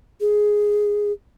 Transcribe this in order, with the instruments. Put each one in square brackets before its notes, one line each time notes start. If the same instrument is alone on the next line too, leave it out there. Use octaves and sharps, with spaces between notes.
[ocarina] G#4